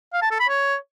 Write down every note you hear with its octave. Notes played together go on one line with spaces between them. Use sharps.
F5
A5
A4
B5
C#5